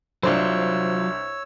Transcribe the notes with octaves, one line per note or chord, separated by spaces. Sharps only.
C2 F#3 D4 F4 C5 C#5 E6